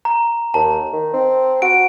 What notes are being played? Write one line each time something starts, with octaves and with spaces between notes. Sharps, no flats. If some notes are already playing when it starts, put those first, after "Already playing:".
A#5
D#2 A5
D#3
C4
F#4 D7